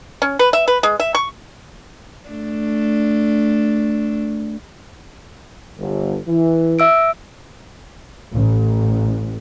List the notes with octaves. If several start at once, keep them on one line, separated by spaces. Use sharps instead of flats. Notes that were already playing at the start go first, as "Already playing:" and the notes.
C#4
B4
E5
B4
G#3
E5
C#6
A3 D4
G1
E3
E5 E6 D7
A1